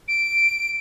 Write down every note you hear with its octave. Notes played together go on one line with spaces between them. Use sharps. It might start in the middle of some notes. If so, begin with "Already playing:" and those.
D7